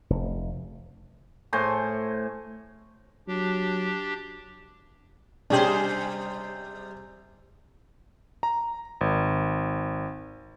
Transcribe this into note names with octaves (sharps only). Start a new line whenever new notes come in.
F1
A2 C5 G#5 C#6
F#3 D4 G4
C3 G3 C#4 D4 G4 G#4 C5
A#5
G#1